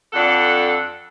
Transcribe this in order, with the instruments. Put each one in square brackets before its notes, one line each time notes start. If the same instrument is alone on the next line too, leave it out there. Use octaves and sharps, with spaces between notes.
[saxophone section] F2 D4 A4 F#5